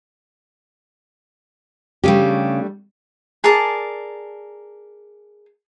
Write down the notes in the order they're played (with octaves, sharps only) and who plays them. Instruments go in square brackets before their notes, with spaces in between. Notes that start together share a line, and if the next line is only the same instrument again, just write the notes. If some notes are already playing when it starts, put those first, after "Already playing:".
[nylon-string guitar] C#3 G4 [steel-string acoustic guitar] G3 A3 D4
[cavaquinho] G#4 A#4 D5 A5